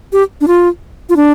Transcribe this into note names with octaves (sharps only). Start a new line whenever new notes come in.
G4
D4
F4
F4
D4